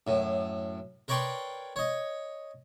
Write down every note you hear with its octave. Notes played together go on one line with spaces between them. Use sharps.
F#2 A2
A#4 B4 C#5 D5 G5 C6
C#5 D#5